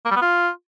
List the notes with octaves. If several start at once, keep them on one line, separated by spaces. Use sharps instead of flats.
A#3
G3
B3
F4